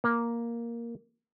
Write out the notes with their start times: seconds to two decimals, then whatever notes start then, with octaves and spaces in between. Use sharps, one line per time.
0.04 A#3